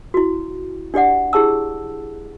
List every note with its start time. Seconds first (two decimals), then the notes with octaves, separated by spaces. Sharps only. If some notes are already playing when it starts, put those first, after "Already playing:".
0.14 E4 F#4
0.94 D4 G4 D5 F#5
1.33 E4 G4 G#4 A5 E6